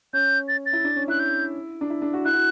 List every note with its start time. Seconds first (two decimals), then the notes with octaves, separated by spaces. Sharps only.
0.13 C#4 G6
0.48 A6
0.66 A6
0.73 E4
0.84 D4
0.96 C#4
1.08 E4 F#6
1.19 G6
1.81 D4
1.90 E4
2.02 D4
2.13 F#4
2.25 E4 F#6
2.34 F#4